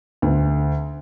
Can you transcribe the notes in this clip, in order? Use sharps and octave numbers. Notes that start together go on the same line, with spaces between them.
D2